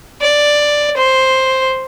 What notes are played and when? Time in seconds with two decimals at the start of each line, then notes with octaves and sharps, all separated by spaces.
0.21 D5
0.97 C5